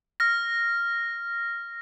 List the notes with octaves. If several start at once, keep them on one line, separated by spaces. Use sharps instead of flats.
F6 A#6